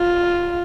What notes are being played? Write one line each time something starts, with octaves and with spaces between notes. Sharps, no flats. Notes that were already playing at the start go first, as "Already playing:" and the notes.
Already playing: F4